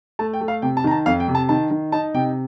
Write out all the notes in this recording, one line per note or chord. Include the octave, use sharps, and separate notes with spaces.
A3 A5
G5
A3
F5
C3 G5
A5
D#3 A#5
A5
F2 F5
G5
C3
A5
D#3 A5
D#3
D#4 A5
C3 G5